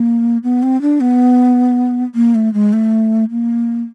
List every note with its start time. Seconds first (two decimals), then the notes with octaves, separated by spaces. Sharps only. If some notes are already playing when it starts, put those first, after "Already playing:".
Already playing: A#3
0.44 B3
0.63 C4
0.82 D4
1.00 B3
2.15 A#3
2.35 A3
2.54 G#3
2.73 A3
3.30 A#3